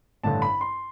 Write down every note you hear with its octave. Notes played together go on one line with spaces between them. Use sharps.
A1 G2 D3 A5
B5
C6